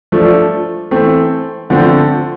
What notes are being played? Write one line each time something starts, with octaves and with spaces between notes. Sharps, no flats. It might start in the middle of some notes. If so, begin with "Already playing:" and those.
F3 A3 D4
E3 A3 C4
D3 F3 A3 C4